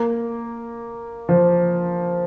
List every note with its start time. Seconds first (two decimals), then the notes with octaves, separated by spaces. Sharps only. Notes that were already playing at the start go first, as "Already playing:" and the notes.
Already playing: A#3
1.29 F3